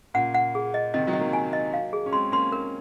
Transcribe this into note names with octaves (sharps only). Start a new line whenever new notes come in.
A#2 C#3 F#5
F#5
G#4
D#5
C3 D#3 D#5
D#3 F#3
D#5
F#3 A#3
G#5
D#5
F5
G#4
C#4
G#3 C4 C6
A#3 C#4 C6
A#4